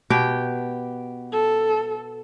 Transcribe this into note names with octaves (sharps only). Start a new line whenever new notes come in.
B2 G4 G5
A4